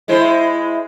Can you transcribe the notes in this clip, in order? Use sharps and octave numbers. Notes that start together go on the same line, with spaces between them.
G#3 E4 C5